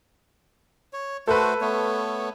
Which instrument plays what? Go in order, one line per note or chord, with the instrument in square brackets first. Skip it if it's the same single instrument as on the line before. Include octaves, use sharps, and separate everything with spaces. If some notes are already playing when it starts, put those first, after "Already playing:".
[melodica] C#5
[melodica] A3 F#4 C5 [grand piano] A4 B4
[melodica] A3 B3 C#5